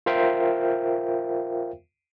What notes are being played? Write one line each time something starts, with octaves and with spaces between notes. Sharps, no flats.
F4 A#4 C5 E5 F5 G5